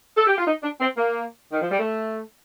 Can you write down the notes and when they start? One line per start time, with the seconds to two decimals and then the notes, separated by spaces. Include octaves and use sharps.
0.17 A4
0.27 G4
0.37 F4
0.47 D#4
0.63 D4
0.81 C4
0.97 A#3
1.52 D#3
1.62 F3
1.70 G3
1.79 A3